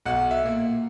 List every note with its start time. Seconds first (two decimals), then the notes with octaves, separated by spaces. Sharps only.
0.05 B1 F#4 F#5
0.31 E5
0.43 A#2 A#3